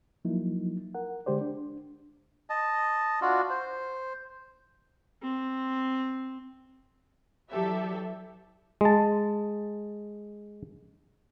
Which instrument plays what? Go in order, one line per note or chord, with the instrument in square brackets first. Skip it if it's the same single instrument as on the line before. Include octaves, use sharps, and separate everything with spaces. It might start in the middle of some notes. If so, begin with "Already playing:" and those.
[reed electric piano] F3 F#3 A#3 D#4 E4
A#4 F#5
D3 G#3 G4 C5 D5
D4
[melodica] D#5 A5
D4 F4 F#4
C5
[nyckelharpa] C4
[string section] E3 F#3 G4 A4 D5 E5
[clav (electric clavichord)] G#3 A5